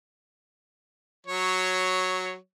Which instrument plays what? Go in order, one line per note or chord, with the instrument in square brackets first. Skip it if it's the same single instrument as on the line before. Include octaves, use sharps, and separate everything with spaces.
[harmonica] F#3 C#5